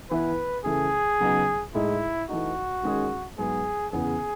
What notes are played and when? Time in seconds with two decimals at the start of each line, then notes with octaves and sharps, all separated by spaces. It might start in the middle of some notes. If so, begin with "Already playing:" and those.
0.10 E3 B3 E4 B4
0.65 C#3 E3 A3 G#4
1.20 C#3 F#3 B3 D#4
1.74 A2 G#3 D#4 E4 G#4
2.29 E3 A3 D#4 F#4
2.83 D#3 G#3 C#4 G#4
3.38 G#2 F#3 B3 G#4
3.92 E2 C#3 E3 B3 G#4